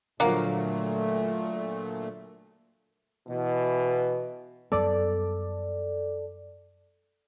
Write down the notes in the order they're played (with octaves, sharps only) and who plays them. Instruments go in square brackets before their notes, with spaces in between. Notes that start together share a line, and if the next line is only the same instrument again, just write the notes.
[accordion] A#2 A3 [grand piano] D3 F3 F#3 [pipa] A#3 F5 F#5
[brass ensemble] B2 E3
[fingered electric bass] F#2 G3 B3 [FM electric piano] A4 D5